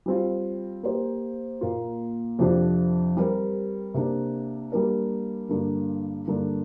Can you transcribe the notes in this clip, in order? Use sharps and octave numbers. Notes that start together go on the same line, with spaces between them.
G3 C4 F4
A#3 G4 C5
A#2 A#3 F4
F2 C3 F3 D4
G3 C4 G4 A#4
C3 A#3 D4
G3 A#3 D4 A#4
G2 D3 A#3 D4
G2 D3 A#3 D4